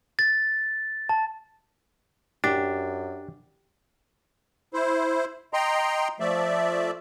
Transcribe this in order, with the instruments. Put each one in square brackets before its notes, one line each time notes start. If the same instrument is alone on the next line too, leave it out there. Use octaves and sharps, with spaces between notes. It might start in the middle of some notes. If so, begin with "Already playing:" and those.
[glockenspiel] A6
A5
[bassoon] F#2 [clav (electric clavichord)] D4 [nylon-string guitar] G4
[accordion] E4 C5
D#5 G5 A#5 C6
F3 A3 D5 E5